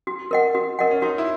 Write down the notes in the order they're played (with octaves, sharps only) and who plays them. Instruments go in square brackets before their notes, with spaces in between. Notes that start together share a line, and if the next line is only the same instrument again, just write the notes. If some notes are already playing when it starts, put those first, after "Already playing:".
[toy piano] F#4
A#4 D#5 F#5
F#4
A#4 D#5 F#5
[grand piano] C#4
[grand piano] D#4 [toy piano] F#4
[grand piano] E4